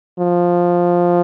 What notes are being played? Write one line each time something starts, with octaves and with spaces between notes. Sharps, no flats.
F3